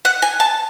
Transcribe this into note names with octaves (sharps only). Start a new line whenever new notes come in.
F#5
G#5
A5